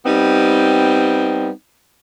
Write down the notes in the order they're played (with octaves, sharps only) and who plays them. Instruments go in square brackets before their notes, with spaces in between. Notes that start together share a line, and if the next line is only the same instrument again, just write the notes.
[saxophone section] G3 B3 C4 D#4